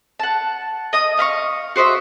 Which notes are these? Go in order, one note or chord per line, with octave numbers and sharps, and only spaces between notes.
F#5 A5
D#5 D#6
D#5 F5 B5 C#6
F#4 C5 D#5 E5